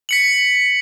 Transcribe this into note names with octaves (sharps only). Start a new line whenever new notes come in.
B6 C#7 F#7